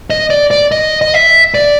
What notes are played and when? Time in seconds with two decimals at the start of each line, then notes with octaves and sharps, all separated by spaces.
0.10 D#5
0.30 D5
0.51 D5
0.72 D#5
1.01 D#5
1.14 E5
1.54 D5